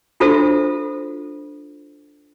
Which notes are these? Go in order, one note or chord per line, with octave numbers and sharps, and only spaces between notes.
D4 F4 F#4 A4 C5 E5